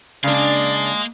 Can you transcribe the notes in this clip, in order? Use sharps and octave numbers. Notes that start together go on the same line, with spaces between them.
C#3 G#3 A#3 D4 D5 F5